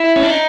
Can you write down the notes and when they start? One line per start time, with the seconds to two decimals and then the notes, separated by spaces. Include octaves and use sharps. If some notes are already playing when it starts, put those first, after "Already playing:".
Already playing: E4
0.16 C#4
0.23 D4
0.30 D#4